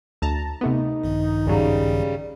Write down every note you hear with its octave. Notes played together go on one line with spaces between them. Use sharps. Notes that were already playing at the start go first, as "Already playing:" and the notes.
D2 A5 A#5
C3 A3 B3 D#4
A#1 G2 D#3
D#2 G#2 C#3 F#3 G3